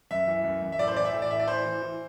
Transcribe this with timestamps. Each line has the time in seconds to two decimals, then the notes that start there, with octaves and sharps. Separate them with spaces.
0.11 F#2 E5
0.27 E3
0.44 F#2
0.62 F#2
0.72 E5
0.79 A2 D5
0.88 C5
0.96 E3 D5
1.05 E5
1.13 A2
1.22 D5
1.30 A2 E5
1.39 D5
1.47 E3 C5
1.65 E3
1.82 E3